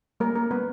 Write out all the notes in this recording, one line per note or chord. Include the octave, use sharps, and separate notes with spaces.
G3 A#3 A#4
A#3 C#4 A#4
G3 B3 B4